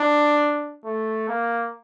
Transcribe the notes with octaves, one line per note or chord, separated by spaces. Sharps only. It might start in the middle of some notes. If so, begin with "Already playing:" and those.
Already playing: D4
A3
A#3